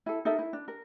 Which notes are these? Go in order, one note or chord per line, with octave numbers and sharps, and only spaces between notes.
E4 A4
D#4 A4 A#4 E5
E4
D4
A#4